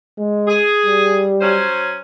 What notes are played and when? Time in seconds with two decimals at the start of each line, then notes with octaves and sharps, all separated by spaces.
0.18 G#3
0.47 G#4
0.86 G3
1.41 F#3 C#4 C5